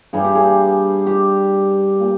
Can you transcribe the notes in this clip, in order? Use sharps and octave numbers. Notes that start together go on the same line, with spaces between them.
G2 G3 G#4
G4
G#4
G4
A#2